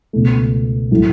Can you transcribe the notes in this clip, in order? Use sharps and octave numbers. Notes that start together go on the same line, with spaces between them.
C#2 B2 A3
A2 F#3 A3